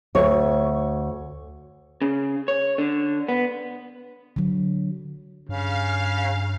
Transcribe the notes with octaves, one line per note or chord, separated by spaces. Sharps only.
D2 C#5
C#3
C#5
D3
B3
D3 F#3
G2 C#3 F5